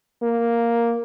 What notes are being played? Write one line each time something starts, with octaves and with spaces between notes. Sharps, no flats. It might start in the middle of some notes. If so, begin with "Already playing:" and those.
A#3